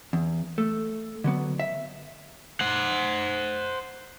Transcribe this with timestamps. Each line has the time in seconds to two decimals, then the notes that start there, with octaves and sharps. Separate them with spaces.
0.13 E2
0.58 A3
1.24 D3 F#3 B3
1.60 E5
2.61 C5 F#5